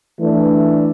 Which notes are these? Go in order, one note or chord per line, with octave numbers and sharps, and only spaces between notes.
E3 A3 D4